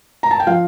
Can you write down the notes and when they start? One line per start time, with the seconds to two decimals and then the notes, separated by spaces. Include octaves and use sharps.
0.23 A#5
0.31 A5
0.40 G5
0.47 F3 F5